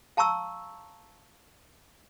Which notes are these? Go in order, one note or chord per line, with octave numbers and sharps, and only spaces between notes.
F5 A5 A#5 C#6 E6